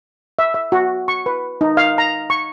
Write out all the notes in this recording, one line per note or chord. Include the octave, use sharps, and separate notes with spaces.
E5
E5
F#4
C#6
B4
D#4
F5
A#5
C#6